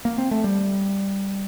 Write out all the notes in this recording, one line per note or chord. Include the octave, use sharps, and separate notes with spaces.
A#3
C4
A3
G3